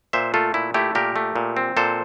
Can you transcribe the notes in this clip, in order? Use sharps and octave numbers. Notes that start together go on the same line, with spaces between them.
A#2 C5 E5
A3 F4 A4
A#2 E4
A3 E4 G4
A#2 G4 A#4
A3
A#2
C4
A#2 A4 C5